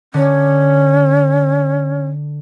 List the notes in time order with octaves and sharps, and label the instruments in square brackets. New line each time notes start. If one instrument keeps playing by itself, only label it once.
[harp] D3 [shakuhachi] C#4